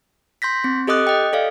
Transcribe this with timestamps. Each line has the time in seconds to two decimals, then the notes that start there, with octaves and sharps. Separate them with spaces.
0.42 C6 G6 A#6 B6
0.64 C4
0.87 G4 A4 D#5 D6 D#6 F#6
1.07 D#5 G5
1.33 A4 D5 F5